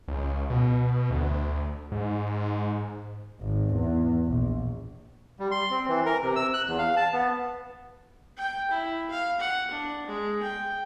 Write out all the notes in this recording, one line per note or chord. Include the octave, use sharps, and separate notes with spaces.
C#2
B2
D2
G#2
G#1
E2
A#1
G3
C6
C4
E3
A#4
C3
E6
F#6
E2
F5
A5
B3
G5
E4
F5
F#5
D4
G#3
G5